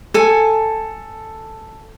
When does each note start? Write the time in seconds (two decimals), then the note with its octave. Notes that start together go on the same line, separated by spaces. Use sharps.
0.14 A4 G#5